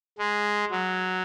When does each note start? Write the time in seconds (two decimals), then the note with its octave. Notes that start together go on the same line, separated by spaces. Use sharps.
0.19 G#3
0.71 F#3